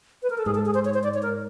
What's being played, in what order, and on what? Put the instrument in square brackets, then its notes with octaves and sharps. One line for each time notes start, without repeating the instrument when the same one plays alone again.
[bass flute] B4
A#4
A4
[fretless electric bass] G#2 [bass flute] G#4
[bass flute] A4
G#4
C5
C#5
C5
D5
C#5
A#4